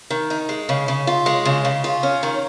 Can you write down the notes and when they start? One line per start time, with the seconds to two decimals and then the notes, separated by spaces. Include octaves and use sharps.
0.10 D#3
0.30 D#4
0.49 G#3
0.69 C#3
0.88 C#3
1.07 F4
1.26 G#3
1.45 C#3
1.65 C#3
1.84 F4
2.03 C#4
2.23 D#3